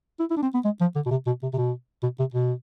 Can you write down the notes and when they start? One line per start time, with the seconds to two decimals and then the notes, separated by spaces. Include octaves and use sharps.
0.19 E4
0.30 E4
0.36 D4
0.42 C4
0.54 B3
0.65 G#3
0.81 F3
0.95 D3
1.06 B2
1.11 C3
1.26 B2
1.42 C3
1.53 C3
1.58 B2
2.03 B2
2.19 C3
2.34 B2